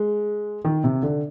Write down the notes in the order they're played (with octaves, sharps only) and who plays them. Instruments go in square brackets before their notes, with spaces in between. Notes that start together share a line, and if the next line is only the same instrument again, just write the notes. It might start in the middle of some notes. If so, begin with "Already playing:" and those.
Already playing: [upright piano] G#3
D#3
C3
D3